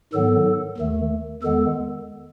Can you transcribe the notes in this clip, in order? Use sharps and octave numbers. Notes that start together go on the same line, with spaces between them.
G#2 D#3 F#3 B3 A4
D#2 D#3 A3
E2 D#3 G#3 B3 A4